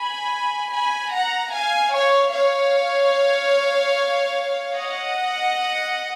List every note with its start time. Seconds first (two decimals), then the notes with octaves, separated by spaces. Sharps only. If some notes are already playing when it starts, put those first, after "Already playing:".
Already playing: G#5 B5
0.71 G#5 B5
1.12 F#5 A#5
1.52 F5 G#5
1.93 C#5 F5
2.33 C#5 F5
4.76 D#5 F#5